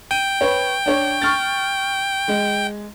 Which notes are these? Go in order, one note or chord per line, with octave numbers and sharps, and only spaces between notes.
G5 D#7
B4 C#5
D4 C#5
C#6 F6 A6
G#3